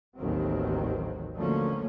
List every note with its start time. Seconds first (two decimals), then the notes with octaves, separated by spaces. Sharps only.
0.17 A1 D#2 D#3 F#3 C4
1.36 D3 F3 F#3 A3 A#3 C#4